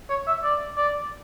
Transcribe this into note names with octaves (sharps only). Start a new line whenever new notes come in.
C#5
E5
D5
D5